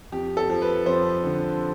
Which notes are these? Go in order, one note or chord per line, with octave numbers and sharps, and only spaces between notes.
F2 G4
A4
F3
B4
F2 C5
D3